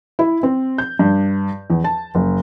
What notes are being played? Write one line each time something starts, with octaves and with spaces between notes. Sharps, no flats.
E4
C4
G6
G2
E2
A5
F#1